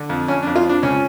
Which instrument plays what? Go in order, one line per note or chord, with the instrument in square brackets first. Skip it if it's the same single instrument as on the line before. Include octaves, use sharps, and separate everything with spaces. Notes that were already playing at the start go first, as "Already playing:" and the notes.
Already playing: [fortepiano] D3
F2
F2 C#4
D4
F2
F4
F3 D4
C#2 C#4